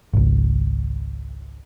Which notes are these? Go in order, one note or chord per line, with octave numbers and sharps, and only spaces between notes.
G#1 C#2